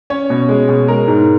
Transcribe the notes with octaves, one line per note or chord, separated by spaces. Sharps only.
C#4 C#5
B2
G#3
B2
G#3 A#4
G#2